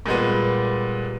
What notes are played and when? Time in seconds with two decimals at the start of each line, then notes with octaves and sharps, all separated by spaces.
0.06 A#2 G3 G#3 B3